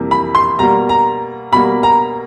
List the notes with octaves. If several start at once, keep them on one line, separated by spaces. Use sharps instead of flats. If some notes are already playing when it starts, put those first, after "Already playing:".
Already playing: F2 C3 E3 G3 A#3
B5
C6
B2 G3 A#3 A#5
A#5
B2 G3 A#3 B5
A#5